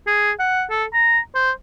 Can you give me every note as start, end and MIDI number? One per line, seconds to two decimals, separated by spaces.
0.07 0.32 68
0.39 0.64 78
0.70 0.85 69
0.94 1.19 82
1.35 1.51 72